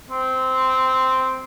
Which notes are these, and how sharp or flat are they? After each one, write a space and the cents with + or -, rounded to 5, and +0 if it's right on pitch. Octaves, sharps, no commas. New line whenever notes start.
C4 -10